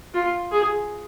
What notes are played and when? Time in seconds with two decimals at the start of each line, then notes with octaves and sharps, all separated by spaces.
0.14 F4
0.52 G#4